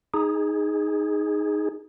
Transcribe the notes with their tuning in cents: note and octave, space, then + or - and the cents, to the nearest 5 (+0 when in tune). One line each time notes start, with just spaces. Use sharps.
D#4 +0 G#4 +0